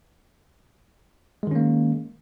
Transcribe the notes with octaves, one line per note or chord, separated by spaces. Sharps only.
D#3 G#3 A#3 C#4